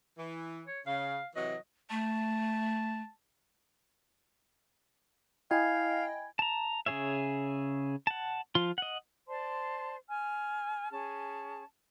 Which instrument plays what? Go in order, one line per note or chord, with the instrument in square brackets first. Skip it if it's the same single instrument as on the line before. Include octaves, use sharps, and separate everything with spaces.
[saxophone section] E3
[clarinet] C#5
[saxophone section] C#3 [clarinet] F5
[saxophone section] C3 E3 F#3 [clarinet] D#5
[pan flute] A3 [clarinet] A5
[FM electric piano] E4 D#5 G5 [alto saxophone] F5 [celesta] G#5 B5 G#6
[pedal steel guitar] A5 A#5
C#3 F3 G#4 C#5 E5
F#5 A5
F3 F4 C6
D#5 F#5
[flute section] C5 D5 A5 C6
G#5 F6
C#4 G#4 A5